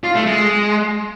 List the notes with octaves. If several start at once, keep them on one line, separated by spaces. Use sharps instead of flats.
F4
A3
G#3